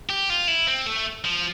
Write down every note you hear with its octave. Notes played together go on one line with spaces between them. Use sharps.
G4
F4
E4
C4
A3
F3